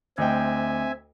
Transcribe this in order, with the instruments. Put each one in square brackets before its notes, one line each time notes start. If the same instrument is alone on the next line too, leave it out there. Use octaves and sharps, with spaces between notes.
[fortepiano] D2 D#5 G5 [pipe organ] C4 E5 G#5